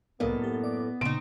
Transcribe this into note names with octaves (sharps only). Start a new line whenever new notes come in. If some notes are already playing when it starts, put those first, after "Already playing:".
C2 F#2 A2 A#3 B3 D#5 F5
G4 A6
D5 D6
A#2 C#3 C4 D#4 D7